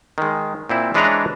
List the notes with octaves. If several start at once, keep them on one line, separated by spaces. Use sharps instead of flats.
D#3 G#3
A#2 C4 E4
E3 G#3 D4 B4 C#5 A#5